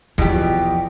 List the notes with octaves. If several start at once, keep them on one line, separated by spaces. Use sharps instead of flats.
E2 B2 F3 G4